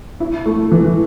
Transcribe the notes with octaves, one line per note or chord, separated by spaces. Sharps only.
E4
A3
E3